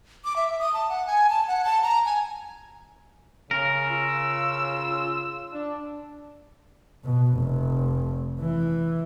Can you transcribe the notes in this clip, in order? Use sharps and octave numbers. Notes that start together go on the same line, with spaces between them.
D6
E5
D#6
A5
F#5
G#5
A5
F#5
A5
A#5
G#5
C#3 A#4
F4 E6
D4
B2
F1
E3